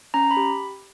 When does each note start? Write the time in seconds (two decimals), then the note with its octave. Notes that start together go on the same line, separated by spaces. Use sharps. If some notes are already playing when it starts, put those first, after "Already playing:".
0.14 C#4 A#5
0.31 B5
0.37 G4